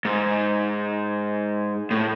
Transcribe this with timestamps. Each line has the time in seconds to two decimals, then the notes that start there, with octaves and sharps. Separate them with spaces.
0.05 G#2
1.91 A2